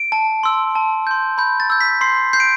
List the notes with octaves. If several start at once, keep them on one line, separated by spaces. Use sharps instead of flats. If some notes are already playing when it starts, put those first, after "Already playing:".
Already playing: D7
A5
C6 E6
A5
C6 G6
B5 G6
A6
E6 G6
B6
C6 C7
G6 C7
D7